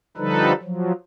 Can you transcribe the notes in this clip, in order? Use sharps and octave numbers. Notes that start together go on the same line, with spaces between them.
D3 F3 G3 D#4 A4 B4
F3 F#3